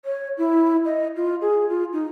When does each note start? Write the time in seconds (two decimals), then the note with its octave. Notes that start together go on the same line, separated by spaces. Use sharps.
0.05 C#5
0.38 E4
0.85 D#5
1.16 F4
1.41 G#4
1.69 F4
1.93 D#4